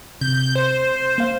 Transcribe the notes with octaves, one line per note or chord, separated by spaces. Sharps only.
C3 G6
C5
A#3 F5